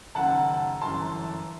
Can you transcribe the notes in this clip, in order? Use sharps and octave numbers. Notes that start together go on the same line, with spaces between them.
F#1 F#2 D#3 F#5 A5
G1 F#2 E3 A5 C6